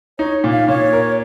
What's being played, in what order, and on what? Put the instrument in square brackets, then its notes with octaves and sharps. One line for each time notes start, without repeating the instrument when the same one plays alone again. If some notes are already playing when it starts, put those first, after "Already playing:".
[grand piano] D#4 [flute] C#5
[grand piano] A#2
[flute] F5
[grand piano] A#2 [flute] C#5
[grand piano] A#4